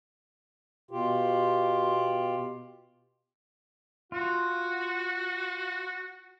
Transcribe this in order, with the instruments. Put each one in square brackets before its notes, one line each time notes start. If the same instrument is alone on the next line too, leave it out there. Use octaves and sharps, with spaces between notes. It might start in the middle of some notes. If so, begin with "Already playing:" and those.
[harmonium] B2 F4 G4
[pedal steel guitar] F4 [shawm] F#4